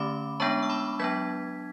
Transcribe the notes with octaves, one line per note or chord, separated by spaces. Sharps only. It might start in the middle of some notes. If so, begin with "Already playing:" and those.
Already playing: D3 A3 C#4 B5 D6
G#3 B3 D4 A5 C#6
E6
B5 D6
F#3 B3 D4 G#6 B6